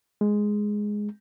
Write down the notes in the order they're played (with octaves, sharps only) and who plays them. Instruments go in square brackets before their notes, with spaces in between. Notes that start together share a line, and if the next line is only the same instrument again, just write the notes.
[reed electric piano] G#3